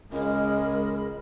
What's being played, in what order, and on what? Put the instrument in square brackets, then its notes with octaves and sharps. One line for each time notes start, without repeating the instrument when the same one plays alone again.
[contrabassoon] C#2 [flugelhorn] G#3 [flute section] G#4 D#5 B5 [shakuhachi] A#4